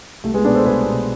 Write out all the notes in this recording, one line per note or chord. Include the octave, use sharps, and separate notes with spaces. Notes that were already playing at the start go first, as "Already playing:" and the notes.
C2 A3
G#3 B3
B2 B3 D4
A4 C5
C2 G#4 B4
B2